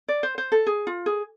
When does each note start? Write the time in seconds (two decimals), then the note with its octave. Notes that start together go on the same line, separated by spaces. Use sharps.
0.08 D5
0.23 C5
0.38 C5
0.52 A4
0.67 G#4
0.87 F4
1.06 G#4